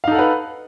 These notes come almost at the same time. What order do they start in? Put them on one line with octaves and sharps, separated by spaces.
F5 D#4 A4 F#5 B4